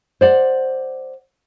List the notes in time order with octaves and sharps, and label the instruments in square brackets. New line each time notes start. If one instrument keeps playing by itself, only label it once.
[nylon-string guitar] C5 D5 F#5